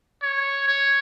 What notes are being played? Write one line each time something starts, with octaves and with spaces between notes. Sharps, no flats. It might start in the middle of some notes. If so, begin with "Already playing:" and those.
C#5
C#5